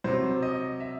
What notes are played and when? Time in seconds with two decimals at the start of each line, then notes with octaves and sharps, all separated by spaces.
0.04 C3 F#3 C5
0.42 D#5
0.80 E5